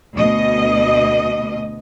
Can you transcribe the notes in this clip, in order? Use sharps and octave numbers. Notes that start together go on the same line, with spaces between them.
D2 B2 D#5